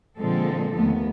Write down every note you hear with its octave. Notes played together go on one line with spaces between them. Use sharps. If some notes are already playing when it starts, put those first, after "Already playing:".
A#2 D3 F3 G#3 C4 A4
D#2 A3 B3